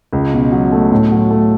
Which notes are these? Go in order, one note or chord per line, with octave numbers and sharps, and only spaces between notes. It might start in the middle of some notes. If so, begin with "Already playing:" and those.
C#2
B2
F#3
A3
A2
F#3
A3